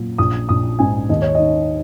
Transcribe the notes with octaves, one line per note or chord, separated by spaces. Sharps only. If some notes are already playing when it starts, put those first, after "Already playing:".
Already playing: A#2 F#3
A#1 D#6
A#1 D#6
G#2 G#5
D#2 D#5
C#5
D#3 D#5